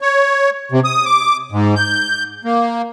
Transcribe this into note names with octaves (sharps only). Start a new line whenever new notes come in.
C#5
C3
D#6
D6
G#2
G6
A#3